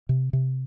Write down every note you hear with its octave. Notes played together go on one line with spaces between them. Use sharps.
C3
C3